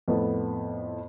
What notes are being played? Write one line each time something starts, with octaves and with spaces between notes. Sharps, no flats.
F2 A2 A3 B3